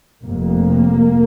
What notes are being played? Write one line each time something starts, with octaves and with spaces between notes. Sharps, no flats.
F1 F2 A#3